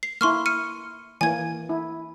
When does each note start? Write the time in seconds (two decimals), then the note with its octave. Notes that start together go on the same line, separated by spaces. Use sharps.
0.03 C7
0.21 A#3 E4 C6 C#6 F6
0.46 F6 C#7 D#7
1.21 E3 A#3 G#5 G#6
1.69 E4